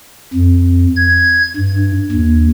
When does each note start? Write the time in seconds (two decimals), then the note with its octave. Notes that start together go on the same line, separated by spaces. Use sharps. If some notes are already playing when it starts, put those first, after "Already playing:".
0.34 F2
0.97 G#6
1.56 G2
2.12 D#2